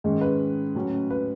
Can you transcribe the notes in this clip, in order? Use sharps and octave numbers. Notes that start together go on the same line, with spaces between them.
G#2 D#3 G#3 C#4
B4
A2 F#3 C#4
B4